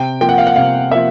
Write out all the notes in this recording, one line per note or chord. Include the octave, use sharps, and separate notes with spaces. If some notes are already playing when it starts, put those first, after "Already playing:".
Already playing: C3 G5
F3 A#3 G5
F#5
F5
F#5
C3 F5
F3 A#3 E5